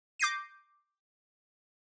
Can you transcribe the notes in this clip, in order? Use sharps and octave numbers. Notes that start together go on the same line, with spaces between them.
D6 G6 A#6 C7 D#7